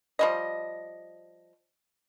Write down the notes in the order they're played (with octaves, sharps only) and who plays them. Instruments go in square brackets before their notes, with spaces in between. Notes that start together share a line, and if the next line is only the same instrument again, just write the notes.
[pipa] F3 G3 D#5